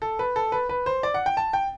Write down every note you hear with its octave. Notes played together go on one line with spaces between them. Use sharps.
A4
B4
A4
B4
B4
C5
D5
F#5
G5
A5
G5